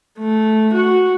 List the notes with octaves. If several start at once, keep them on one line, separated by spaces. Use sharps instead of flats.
A3
F#4